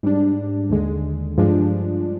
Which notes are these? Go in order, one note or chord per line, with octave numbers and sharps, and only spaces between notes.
G#2 G3 D4
D#2 D3 G#3
G2 F3 G#3 D4